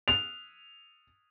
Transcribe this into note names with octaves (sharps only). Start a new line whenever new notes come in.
F7